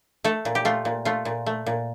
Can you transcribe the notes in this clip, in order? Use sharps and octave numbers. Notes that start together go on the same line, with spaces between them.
A3 A4
A#2
G4
A3 F4
A#2
A3 F4
A#2
A3
A#2